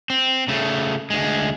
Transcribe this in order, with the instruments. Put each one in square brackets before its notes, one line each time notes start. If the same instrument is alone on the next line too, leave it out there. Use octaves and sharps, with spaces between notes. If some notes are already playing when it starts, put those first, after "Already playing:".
[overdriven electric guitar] C4
C#3 A3
D2 G#3